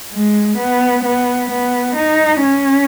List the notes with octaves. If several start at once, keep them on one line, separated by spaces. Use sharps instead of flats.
G#3
B3
B3
B3
D#4
C#4